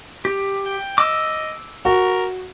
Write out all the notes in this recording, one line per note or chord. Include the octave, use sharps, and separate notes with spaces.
G4
G5
D#5 D6 E6
F#4 A#4